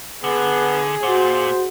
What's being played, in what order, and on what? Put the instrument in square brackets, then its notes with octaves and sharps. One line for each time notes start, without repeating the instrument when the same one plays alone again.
[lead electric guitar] D3 [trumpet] B3 [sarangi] G#4
[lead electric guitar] A#2 [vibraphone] F#4 F#5 [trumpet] C5